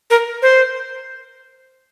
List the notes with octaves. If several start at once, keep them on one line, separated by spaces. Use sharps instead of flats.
A#4
C5